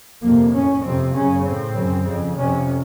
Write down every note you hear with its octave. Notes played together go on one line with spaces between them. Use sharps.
F2 C3 A#3
A2 C#4
F2 C3 C4
F#2 C#3 C#4
A2 C4
F#2 C#3
F2 C#3
F2 C3 C#4